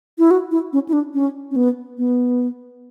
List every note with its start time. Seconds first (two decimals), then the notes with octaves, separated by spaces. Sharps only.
0.19 E4
0.31 F#4
0.51 E4
0.73 C#4
0.89 E4
0.93 D4
1.14 C#4
1.51 C#4
1.56 B3
1.98 B3